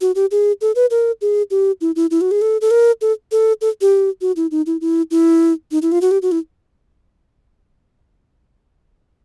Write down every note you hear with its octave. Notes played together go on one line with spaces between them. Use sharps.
F#4
G4
G#4
A4
B4
A#4
G#4
G4
E4
E4
E4
F#4
G#4
A4
A4
A#4
A4
A4
A4
G4
F#4
E4
D#4
E4
E4
E4
D#4
E4
F4
F#4
G4
F#4
E4